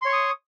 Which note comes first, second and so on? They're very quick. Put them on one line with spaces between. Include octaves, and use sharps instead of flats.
C6 C#5 C#6 D#6